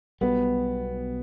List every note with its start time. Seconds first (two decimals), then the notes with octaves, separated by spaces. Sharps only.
0.21 B1 B2 G3 B3